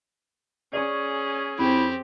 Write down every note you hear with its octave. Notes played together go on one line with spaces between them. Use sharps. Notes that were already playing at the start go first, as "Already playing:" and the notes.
C#4 G#4 D5 C#6
F2 C4 E4 G4